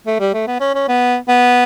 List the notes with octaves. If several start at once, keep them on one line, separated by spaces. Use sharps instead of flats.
A3
G3
A3
B3
C#4
C#4
B3
B3